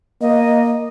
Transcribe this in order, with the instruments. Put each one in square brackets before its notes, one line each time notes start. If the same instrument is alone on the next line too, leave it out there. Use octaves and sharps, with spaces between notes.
[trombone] A#3 [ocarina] D#5